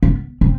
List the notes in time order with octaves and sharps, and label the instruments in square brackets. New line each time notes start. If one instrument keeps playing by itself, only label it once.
[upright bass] B3
C4